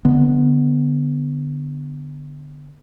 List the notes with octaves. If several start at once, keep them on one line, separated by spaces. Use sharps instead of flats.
D3 B3